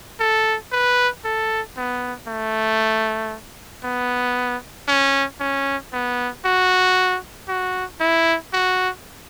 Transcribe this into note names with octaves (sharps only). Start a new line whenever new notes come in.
A4
B4
A4
B3
A3
B3
C#4
C#4
B3
F#4
F#4
E4
F#4